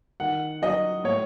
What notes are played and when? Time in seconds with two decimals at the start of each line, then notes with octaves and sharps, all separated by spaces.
0.20 D#3 F#5
0.62 F#3 D#5
1.04 A2 C#5